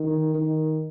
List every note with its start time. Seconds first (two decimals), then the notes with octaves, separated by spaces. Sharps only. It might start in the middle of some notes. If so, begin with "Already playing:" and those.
Already playing: D#3
0.34 D#3